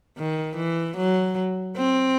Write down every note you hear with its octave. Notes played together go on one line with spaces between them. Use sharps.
D#3
E3
F#3
C4